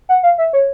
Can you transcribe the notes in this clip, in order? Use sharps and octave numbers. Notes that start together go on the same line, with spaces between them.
F#5
F5
E5
C#5